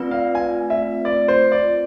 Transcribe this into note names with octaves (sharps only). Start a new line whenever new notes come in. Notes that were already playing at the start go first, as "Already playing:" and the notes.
Already playing: A3 C4 F4 B4 D5
F5
G#5
E5
D5
C5
D5